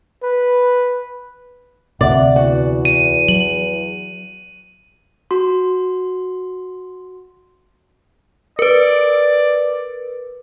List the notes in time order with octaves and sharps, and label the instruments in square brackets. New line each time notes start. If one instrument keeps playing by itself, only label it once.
[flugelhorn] B4
[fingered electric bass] D2 C3 [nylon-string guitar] D5 [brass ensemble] E5 F#5
[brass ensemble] E2 [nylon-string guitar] F#4
[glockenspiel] D#7
[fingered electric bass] F#3 [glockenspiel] F#7
[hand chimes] F#4 C6
[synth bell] A#4 B4 [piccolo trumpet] D5